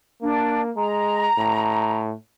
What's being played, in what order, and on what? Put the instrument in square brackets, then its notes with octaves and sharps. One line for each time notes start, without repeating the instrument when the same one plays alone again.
[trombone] A#3 [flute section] D4
[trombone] G#3 [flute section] A#5
[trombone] A2